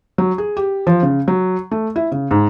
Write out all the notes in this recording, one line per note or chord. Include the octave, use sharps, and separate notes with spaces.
F#3
G#4
G4
F3
C#3
F#3
A3
E4
C#3
G#2